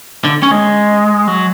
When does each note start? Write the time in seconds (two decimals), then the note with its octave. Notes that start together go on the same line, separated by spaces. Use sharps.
0.25 D3
0.43 C#4
0.51 G#3
1.27 F#3